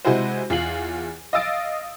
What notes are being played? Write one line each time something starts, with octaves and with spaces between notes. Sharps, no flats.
C3 G#3 E4 F#4 G#4 C5
E2 F4 C7 F#7
D#5 F5 D#6 E6 A6 D7